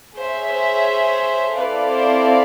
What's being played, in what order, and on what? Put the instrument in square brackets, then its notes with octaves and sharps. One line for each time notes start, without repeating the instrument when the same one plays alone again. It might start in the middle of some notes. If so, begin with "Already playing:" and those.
[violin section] G#4 C#5 E5 [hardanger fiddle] C5
[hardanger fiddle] C5
[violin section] C4 E4 A4 D5 F5 [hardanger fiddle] B4
[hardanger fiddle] C5